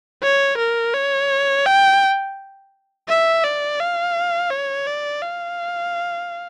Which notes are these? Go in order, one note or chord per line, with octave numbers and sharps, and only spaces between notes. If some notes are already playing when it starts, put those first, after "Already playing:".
C#5
A#4
C#5
G5
E5
D5
F5
C#5
D5
F5